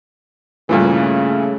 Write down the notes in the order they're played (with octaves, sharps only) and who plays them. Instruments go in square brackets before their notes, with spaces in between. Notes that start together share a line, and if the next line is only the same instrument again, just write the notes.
[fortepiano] G2 A#2 E3 [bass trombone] C#3 [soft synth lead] A3